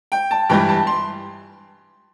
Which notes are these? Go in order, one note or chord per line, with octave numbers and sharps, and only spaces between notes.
G5
A5
G2 E3 G3 G5
A5
C6